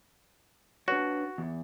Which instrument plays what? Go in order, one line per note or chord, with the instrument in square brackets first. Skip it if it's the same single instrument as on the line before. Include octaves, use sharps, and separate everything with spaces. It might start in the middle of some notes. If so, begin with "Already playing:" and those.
[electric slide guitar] D4 B4 C#5 [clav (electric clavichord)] F#4
[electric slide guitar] E2